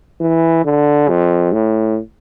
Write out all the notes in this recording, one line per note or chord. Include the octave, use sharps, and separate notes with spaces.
E3
D3
F2
A2